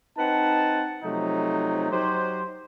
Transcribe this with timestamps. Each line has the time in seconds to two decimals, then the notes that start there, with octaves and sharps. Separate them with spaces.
0.18 C4 D#4 B4 F#5 A5
1.02 C3 F3 F#3 A3 D#4
1.91 F#3 D#4 G4 C5